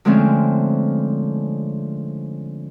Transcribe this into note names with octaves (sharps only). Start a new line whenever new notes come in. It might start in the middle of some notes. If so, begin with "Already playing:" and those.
D3 F3 G#3 A3 C4 C#4